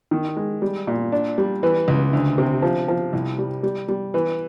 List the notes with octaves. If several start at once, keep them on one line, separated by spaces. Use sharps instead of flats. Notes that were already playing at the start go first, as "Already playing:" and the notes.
D#3
G#3
G3
A#2
D4
G3
E3
C#2
D2
C3
F3
F3
C2
G3
G3
G3
E3